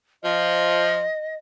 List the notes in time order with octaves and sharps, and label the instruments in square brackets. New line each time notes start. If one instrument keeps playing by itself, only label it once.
[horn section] F3 [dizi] D#5